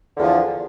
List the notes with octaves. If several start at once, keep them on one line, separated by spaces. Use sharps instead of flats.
E2 D3 F3